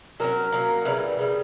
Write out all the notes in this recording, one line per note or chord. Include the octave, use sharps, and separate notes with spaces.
F#3 A#3 C#4 A#4
F#3 A#3 C#4
C#3 E3 G3 B4
C#3 E3 G3